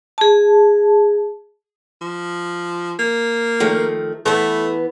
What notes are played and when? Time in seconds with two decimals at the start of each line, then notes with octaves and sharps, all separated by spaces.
0.18 G#4 A5
2.01 F3
2.99 A#3
3.60 D#3 F3 A3
4.26 E3 A3 B3